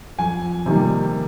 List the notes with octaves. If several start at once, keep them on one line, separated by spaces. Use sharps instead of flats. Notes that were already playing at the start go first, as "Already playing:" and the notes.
F2 G#5
C3 D#3 G3 A#3